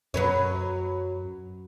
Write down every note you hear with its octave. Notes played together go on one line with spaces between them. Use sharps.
F#2 F#3 B4 C#5